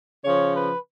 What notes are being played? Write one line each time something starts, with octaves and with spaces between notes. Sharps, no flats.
C#3 F3 C#5
B4